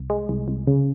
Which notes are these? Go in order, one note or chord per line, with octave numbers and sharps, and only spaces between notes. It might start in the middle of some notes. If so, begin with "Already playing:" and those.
Already playing: C2
G#3
C2
C2
C#3